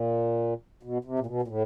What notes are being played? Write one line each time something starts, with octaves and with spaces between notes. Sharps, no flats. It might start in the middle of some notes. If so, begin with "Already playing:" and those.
Already playing: A#2
B2
C3
A#2
B2
A#2
A2